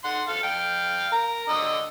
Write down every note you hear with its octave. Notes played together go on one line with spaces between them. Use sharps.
F#5 C6
A4 F5
F5 G5
A#4
D3 D#5 E6